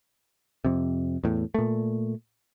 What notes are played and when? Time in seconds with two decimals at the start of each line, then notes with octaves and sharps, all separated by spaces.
0.65 F2 C3
1.24 E2 A2
1.54 A#2 A3